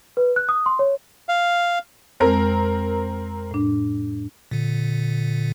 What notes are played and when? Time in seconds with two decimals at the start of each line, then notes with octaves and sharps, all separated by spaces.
0.17 B4
0.36 F#6
0.49 D#6
0.66 C6
0.79 C#5
1.29 F5
2.20 F2 G#3 C4 A#4
3.51 A2 D4
4.51 A#2 D3